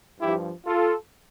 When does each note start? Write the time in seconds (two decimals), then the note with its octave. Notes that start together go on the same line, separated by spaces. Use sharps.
0.20 G2 F3 E4 G4
0.66 F4 A4